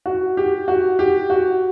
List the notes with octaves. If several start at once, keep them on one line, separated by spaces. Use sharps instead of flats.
F#4
G4
F#4
G4
F#4